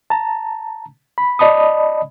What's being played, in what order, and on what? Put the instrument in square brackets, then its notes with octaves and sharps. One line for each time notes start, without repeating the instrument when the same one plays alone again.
[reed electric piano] A5 A#5
B5
D5 D#5 A5 B5 D#6